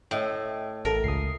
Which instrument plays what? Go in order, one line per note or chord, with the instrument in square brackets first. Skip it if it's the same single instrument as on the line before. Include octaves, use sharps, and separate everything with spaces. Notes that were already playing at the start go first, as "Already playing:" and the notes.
[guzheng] A2 [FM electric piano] D#5 E5 G5
[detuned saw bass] A1 [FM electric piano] A4 A5 [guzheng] A#4
[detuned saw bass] C#2 [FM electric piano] D#6 C7